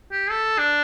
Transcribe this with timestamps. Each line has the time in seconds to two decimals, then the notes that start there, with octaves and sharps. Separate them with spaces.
0.12 G4
0.30 A4
0.58 D4